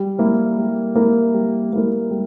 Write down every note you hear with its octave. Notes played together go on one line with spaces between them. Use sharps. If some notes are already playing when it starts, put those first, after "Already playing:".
Already playing: G3
A#3 E4 A#4
G3
A#3 E4 A#4
G3
A#3 E4 A#4
G3